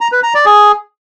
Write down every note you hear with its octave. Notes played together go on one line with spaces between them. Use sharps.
A#5
B4
A#5
D5
G#4